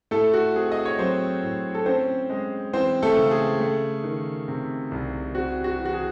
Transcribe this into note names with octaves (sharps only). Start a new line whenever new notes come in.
A2 A3 A4
F#4
C4 G#4
D#5
C#5
F#3 C4 C5
A2
A4
C4 C#4 C5
G#3
E3 C4 C5
A3 A4
C#3
G#4
A3
D#3
C3
C2
C4 F#4
F#4
E3
F#4
G#4